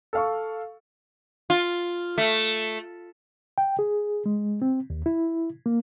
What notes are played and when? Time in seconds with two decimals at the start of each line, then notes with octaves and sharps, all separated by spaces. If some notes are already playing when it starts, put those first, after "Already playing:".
0.13 A4 F5 C#6
1.50 F4
2.18 A3
3.58 G5
3.79 G#4
4.26 G#3
4.62 C4
4.90 D#2
5.06 E4
5.66 A#3